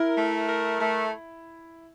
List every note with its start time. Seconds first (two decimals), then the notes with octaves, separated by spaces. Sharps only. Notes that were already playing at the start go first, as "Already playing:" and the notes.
Already playing: E4 A#4
0.17 A3
0.48 A#4
0.80 A3